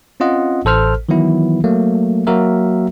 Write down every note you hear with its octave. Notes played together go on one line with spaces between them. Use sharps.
C4 C#4 F4 D#5 F#5
A1 A4 C5 F6
D#3 E3 F#3 B3 E4
F#3 A3 A#3
F#3 A#3 F#4 A#4 E5